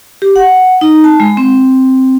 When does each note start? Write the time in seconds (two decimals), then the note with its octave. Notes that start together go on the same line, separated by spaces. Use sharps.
0.22 G4
0.36 F#5
0.81 D#4
1.04 A5
1.20 G#3
1.37 C4